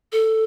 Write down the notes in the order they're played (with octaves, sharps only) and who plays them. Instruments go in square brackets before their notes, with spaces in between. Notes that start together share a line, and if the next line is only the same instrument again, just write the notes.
[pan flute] A4